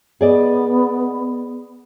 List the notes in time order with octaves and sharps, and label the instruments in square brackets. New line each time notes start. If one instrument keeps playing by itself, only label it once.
[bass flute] B3 [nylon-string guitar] G#4 D5 D#5